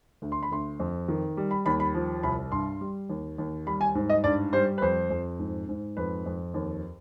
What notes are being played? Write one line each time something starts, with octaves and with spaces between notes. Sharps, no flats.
D2
C6
B5
D2 C6
F2
D#3
G3
B5
D#2 B5
B5
F3
C2 B5
G2 C6
G3
D#2
D#2
G3 B5
G#5
G#2
D#5
G2 D5
G3 C5
B4
F2 C5
F2
G#2
G#2
F2 B4
F2
D#2